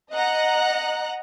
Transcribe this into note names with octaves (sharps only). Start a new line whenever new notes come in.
D#5 F#5 A#5 F#6